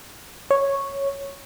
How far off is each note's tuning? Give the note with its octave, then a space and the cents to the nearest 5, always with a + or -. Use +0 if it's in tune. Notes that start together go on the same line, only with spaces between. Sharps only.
C#5 -5